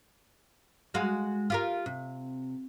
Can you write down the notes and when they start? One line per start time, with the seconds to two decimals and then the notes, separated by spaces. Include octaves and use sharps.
0.94 G#3 F#4 F5
1.50 F4 G4 A#4
1.86 C3